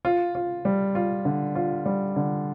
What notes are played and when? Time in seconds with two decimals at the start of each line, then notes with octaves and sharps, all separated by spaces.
0.05 F4
0.35 F4
0.65 G3
0.95 F4
1.25 D3
1.55 F4
1.86 G3
2.16 D3